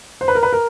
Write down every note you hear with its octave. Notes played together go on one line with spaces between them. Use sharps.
C5
B4
A#4
B4
A#4